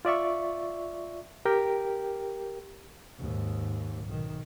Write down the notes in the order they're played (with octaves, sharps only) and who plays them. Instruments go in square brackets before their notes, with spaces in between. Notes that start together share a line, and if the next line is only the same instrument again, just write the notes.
[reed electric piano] F4 D5 E5 C#6
G4 A#4 G5
[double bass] D#2 G#2
B1 D#3